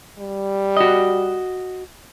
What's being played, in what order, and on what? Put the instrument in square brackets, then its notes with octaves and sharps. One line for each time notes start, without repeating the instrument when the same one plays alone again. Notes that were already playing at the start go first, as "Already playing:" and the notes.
[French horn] G3
[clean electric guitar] F#4 D#5